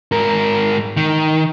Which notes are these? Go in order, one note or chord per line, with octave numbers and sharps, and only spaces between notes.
G#2 A#4
D#3